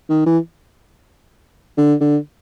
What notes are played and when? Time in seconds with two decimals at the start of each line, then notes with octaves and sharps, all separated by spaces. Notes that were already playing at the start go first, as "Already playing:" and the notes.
0.09 D#3
0.26 E3
1.78 D3
2.01 D3